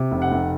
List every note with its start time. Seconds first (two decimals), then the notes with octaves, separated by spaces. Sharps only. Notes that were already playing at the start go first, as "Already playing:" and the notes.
Already playing: C3
0.11 F1
0.22 F#5
0.31 F1